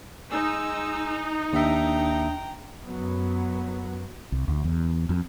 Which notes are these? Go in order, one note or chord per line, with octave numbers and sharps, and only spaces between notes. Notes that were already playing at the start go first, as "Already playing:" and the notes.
G#3 D#4 G#5 E6
D#2 D4 E5 G5 A#5
F#2 F#3 B3
C2
D2
E2
F2